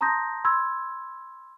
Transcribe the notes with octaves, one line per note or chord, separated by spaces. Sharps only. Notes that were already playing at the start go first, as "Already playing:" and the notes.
A5 A#5 C6 D#6 G6 A#6
B5 C6 E6 G#6